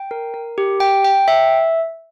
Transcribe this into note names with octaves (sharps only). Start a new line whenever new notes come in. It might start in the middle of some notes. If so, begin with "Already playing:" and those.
Already playing: G5
A#4
A#4
G4
G5
G5
E5